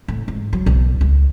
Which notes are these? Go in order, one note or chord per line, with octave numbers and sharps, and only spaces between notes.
A2
G#2
F#3
B1
C#2